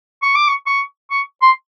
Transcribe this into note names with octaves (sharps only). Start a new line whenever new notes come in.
C#6
D6
C#6
C#6
C#6
C6